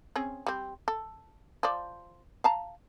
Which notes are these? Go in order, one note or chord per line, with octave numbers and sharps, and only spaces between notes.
C4 C#4 G#4
G3 C4
A4
F3 D5
F5 A5 A#5